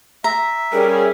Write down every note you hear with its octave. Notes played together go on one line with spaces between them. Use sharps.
E5 A#5
G3 C#4 G#4 A#4